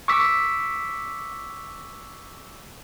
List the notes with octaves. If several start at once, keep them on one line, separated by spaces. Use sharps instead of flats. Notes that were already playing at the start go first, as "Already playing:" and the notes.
C#6 D6 E6 B6